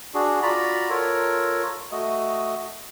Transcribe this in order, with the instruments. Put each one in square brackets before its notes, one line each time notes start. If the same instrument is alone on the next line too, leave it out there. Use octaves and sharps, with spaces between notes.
[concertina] D4 F#4 G#4
F4 F#4 D5 A#5 B5
F4 A4 A#4 C#5
A3 F#4 D#5